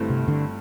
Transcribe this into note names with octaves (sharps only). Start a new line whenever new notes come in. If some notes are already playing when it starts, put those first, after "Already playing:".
Already playing: G1 G2 E3 A3 C4
C3
D3